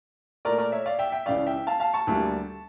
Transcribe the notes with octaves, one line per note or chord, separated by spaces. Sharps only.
A#2 A3 A#4 D5
A#4 D5
C#5 E5
D5 F5
E5 G5
E5 G5
C#2 C#3 E3 D5 F5
E5 G5
F5 A5
F5 A5
A5 C#6
D2 D3 G3 A#3